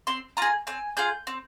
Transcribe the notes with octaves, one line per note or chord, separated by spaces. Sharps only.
C4 C6
F4 G#4 A#5
C4 G#5
F4 G#4 G6
C4